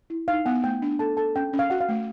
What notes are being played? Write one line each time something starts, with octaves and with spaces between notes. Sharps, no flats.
E4
D#4 F5
B3 F#5
A3 G5
D4
A4 A5
A4 A5
C#4 G5
C#4
F5
F#4 F#5
F5
A3